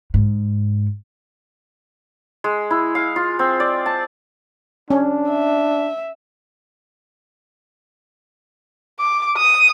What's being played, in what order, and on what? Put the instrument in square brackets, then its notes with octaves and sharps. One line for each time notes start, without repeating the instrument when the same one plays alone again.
[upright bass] G#2
[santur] G#3
E4
F5
F4
C4
D5
A5
[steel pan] C#4 [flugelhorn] D4
[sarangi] E5
[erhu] D6
D#6